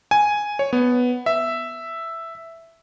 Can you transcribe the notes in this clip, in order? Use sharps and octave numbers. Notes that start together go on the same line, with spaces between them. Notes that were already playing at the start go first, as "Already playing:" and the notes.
G#5
C#5
B3
E5